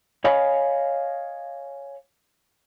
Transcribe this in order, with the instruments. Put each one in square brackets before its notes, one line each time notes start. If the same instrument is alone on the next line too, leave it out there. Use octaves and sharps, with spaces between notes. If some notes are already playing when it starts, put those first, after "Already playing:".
[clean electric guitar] C#5 D#5 F5 G#5 B5